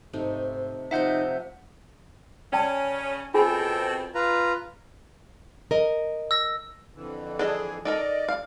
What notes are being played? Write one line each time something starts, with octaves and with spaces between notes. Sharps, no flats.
G#2 C3 A3 D#4
C3 F3 D#4 C5 E5 F#5 G6
C#3 C#4 D5 G5 A5
B2 C4 F4 G#4 A4 G5 G#5
F4 B4 A#5
A#4 D#5
E6 A#6
F2 D3 E3
D4 G#4 A4 D#5
D#4 A4 A#4 D5 D#5
F5